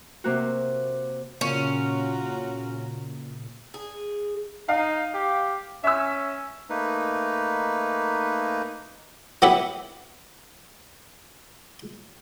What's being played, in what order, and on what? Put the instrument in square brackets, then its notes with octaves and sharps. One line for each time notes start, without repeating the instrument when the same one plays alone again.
[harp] C3 A#3 F#4
[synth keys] A#2 C#3 [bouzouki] C#4 [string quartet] F4 F#4 A#5
[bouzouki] G#4
[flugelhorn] D#4 [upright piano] F5
[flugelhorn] G4
[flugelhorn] C#4 [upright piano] E5 E6
[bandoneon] A3 A#3 D#4 B4
[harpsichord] F#3 B3 E4 G4 E5 F#5